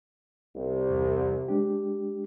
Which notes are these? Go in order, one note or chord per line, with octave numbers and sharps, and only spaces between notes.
C2
E2
G#3 D4 G4